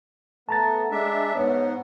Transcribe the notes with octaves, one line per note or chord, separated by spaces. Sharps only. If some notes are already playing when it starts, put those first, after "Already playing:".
A3 B3 A5 A#5 A6
G#3 D4 E5
G#2 B3 C#5